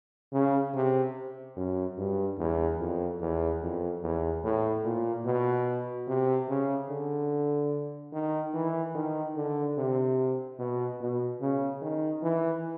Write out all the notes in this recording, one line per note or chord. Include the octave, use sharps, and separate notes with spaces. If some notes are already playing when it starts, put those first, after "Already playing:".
C#3
C3
F#2
G2
E2
F2
E2
F2
E2
A2
A#2
B2
C3
C#3
D3
D#3
E3
D#3
D3
C3
B2
B2
C#3
D#3
E3